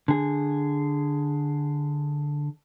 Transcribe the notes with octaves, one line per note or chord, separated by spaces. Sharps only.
D3 G#4